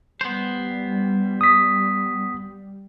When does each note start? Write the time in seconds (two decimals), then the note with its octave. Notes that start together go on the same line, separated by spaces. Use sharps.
0.21 G3 B3 C5
1.41 D#6 B6